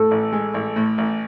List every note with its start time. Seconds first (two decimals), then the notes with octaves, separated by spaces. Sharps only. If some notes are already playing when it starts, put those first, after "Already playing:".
Already playing: A2 A4
0.11 A1
0.32 G#3
0.54 A1
0.76 A2
0.98 A1